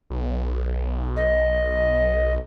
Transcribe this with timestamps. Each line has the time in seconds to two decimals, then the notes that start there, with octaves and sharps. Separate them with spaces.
0.10 B1
1.16 D#5